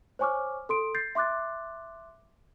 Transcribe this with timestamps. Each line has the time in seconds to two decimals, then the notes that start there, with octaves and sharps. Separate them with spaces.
0.19 C5 C#5 G#5 C#6 D6 F6
0.69 A4 C6 D7
0.95 G6 A6 C7
1.15 E5 C6 D6 F#6 A6